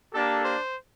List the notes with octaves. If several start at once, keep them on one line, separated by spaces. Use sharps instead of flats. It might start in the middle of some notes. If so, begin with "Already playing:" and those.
A#3 D4 G4 A4
C5